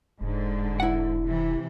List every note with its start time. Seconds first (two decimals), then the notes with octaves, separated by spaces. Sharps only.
0.21 E1 G#2 D3
0.80 E4 F#5
1.23 C3 E3